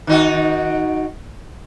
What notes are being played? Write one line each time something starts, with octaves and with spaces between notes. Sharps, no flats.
D#3 D#4 F#4